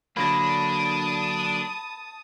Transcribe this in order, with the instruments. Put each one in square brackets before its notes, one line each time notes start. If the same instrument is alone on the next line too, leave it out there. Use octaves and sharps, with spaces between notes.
[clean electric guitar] D3 F#3 A#3 [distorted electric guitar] D4 [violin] A5 D#6 [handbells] B5 A#6